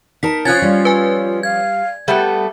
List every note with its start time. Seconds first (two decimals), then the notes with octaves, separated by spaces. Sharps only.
0.23 D#4 A#4 A5 B6
0.45 F3 C#4 F4 F#6 G#6 A6
0.62 G3 F4
0.85 B4 G#5
1.43 F5 G#6
2.08 G3 A3 B3 E5 F#5